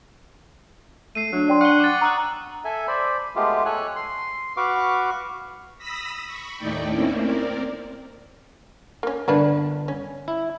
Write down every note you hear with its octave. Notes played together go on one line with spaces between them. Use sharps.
A3 C7 D#7
F#3 D4
D5 G5 C6
F#5 C#6 G7
D6 A6
A#5 D#6 E6 F#6
A4 E5 G#5
C5 D5 B5
G#3 A3 B3 F4 G4
A4 C#5 G#5 F#6
C6
F#4 B4 F5 C#6 D6
B5 D#6 E6 A#6 B6
B5 C#6
D#2 A2 A3 D#4 D5 G5
A3 A#3 C4 C#4 E4
C4 A#4 D5
A#3 C#4
G1 D3 A#3 D4 B4
C#4
E4